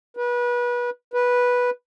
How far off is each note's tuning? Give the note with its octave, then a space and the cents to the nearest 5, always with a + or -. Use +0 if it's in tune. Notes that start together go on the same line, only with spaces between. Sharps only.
B4 -30
B4 -10